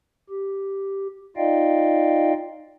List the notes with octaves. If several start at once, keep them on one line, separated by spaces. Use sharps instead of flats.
G4
D#4 F4 D5 D#5 F5 G5